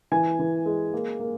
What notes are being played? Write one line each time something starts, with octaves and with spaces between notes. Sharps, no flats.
E3 G#5
E3
G#3
A#3
A#3